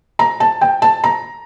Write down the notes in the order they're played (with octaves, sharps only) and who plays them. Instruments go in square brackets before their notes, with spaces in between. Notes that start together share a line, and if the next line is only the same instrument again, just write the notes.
[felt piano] A#5
A5
G5
A5
A#5